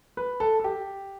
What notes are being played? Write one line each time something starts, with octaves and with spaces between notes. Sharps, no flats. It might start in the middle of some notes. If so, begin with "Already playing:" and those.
B4
A4
A4
G4